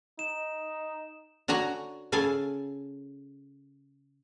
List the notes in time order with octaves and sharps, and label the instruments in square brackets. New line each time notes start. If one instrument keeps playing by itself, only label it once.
[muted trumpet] D#4 [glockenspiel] E7
[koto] D3 F#4 C#5 G#5 A#5
C#3 G#4 A4 F5 G#5